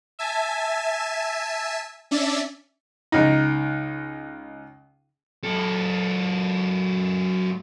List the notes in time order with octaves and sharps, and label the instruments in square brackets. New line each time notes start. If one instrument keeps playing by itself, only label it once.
[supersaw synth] E5 G#5 A5
C#4 D4 D5 E5
[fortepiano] C#2 D#4
[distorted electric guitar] F#2 A4